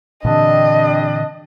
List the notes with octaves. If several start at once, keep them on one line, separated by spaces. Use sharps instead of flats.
A#2 D3 E3 G3 C4 D4 D#5